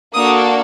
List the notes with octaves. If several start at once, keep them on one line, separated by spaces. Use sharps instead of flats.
A#3 D4 F#4 A4 D#6